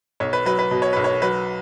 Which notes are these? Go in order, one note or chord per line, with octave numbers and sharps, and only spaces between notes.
B1 C#5
B4
F#3 B4
B4
B2
C#5
B1 B4
C#5
F#3 B4